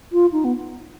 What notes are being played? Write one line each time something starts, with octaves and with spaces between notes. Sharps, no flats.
F4
D#4
B3